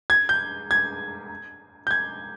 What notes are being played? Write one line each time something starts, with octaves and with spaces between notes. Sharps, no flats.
G#6
G6
G#6
G6
G#6